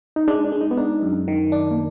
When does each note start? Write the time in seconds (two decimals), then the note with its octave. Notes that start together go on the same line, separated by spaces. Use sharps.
0.16 D#4
0.28 G#3 D4
0.44 D4
0.52 G#3
0.61 D#4
0.71 B3
0.77 D4 D#4
1.03 F#2
1.28 D#3
1.52 D4
1.71 A#3